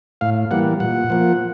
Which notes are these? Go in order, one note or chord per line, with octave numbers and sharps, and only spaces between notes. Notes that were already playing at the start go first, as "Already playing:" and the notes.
A2 F5
E3 G3 A#3 F#5
A#2 F#5
F3 A#3